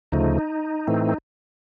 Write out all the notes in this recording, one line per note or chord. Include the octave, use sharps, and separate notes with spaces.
D2 C#3 F3 A3 D#4
A2 E3 A3 C4